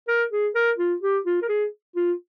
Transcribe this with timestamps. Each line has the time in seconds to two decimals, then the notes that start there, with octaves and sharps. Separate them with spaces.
0.08 A#4
0.31 G#4
0.55 A#4
0.78 F4
1.02 G4
1.26 F4
1.42 A#4
1.49 G#4
1.96 F4